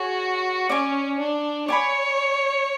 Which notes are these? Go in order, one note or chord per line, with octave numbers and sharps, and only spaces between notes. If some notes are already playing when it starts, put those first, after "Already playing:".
Already playing: F#4 G#4 C#5 G#5
C#4 D5 G#5 C#6
D4
C#5 D5 G#5 B5